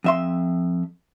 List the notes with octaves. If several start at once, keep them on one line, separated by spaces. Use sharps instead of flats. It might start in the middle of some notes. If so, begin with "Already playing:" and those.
F2 E5 C6